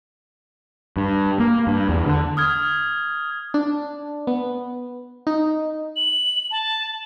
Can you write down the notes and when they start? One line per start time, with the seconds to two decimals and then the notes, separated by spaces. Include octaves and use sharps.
0.97 G2
1.40 A#3
1.67 G2
1.89 E2
2.06 D3
2.37 D#6 F6 G#6
3.54 D4
4.27 B3
5.27 D#4
5.96 F#7
6.51 A5